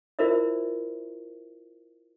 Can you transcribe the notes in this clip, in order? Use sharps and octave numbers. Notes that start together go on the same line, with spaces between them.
E4 F4 A#4 C5 D5 E5